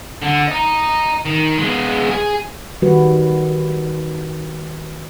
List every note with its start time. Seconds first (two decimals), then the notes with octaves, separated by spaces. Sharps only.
0.22 D3
0.48 D#5 A#5
1.25 D#3
1.58 G#3 B3
2.11 G#4
2.82 D#3 G3 F#4 B4